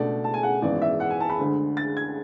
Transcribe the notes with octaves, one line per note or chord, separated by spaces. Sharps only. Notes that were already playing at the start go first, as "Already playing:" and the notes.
Already playing: C#2 B2 A3 D4 D5
A5
G#5
F#5
G#1 F#2 E3 B3 D5
E5
F#5
G#5
A5
B5
D2 D3 G#3
A6
G#6